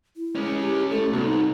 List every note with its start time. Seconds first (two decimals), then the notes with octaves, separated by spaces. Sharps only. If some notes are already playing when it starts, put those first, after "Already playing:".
0.17 E4
0.35 G#3 C#4
0.60 G4
0.91 A3 C#4 A4
1.13 C2 B3 F#4
1.24 C4 D#4